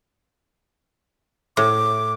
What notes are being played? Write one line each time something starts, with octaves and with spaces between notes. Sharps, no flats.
A2 D6